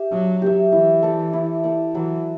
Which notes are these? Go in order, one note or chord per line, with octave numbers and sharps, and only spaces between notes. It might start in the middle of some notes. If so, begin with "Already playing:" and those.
Already playing: G4 E5
F#3 D4
G4 C#5 E5
E3 E4
A4 D5
E4
A4 D5
E3 F#3